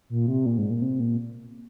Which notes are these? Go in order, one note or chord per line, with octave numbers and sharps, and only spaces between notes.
A#2
C3
A#2
G#2
A#2
C3
A#2